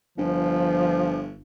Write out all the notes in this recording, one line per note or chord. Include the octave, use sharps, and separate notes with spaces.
G1 F3